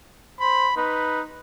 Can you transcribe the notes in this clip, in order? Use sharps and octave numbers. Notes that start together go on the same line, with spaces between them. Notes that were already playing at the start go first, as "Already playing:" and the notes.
C5 B5
D#4 B4